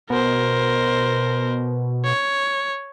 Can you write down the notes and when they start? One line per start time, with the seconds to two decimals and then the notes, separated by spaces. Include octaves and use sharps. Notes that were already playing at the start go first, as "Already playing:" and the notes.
0.10 B2 A#4 C5
2.04 C#5